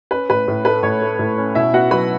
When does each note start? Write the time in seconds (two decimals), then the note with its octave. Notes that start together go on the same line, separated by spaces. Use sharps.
0.11 C#4 B4
0.30 A2 B4
0.48 A2
0.65 A3 B4
0.83 A2 C#5
1.02 A3
1.19 A2
1.38 C#4
1.55 B2 E4 E5
1.73 B3 F#4 F#5
1.91 F#3 B4 B5